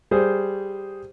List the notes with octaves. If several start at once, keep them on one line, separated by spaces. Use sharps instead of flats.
G3 G#4 C5